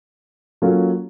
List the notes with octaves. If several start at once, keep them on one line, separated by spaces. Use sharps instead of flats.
F#3 A#3 C#4 F4 A4